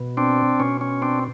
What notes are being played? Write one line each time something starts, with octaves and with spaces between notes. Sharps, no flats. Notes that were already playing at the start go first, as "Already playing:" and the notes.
Already playing: B2
C4 D4
B2 C#4
C#4
C4 D4